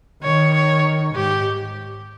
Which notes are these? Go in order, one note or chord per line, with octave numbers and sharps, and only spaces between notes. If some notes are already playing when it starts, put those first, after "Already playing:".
D#3 C#5
C#5
G#2 G4